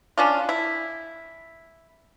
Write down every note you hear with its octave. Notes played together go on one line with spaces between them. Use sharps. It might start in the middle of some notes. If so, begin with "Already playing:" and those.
C#4 D4 F4
E4